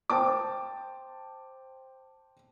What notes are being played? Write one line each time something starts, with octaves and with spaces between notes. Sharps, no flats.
C5 G5 A5 D6